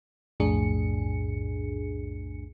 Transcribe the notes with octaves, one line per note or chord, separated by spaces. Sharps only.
B1 F2 A2 D4 G#4 C#7